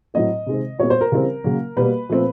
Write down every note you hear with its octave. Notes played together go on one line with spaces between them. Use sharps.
A2 F#3 A3 C4 D#5
C3 D#3 G#3 C4
A#2 G3 B3 C#5
C5
A#4
C#3 E3 G3 C4
C#3 F#3 A#3
B2 G3 A#3 B4
A#2 F3 A3 C4